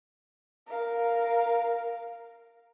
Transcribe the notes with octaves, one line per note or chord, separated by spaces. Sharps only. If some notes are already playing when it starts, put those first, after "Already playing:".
A#4 F5